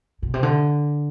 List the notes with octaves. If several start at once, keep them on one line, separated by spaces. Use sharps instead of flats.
B2
C3
D3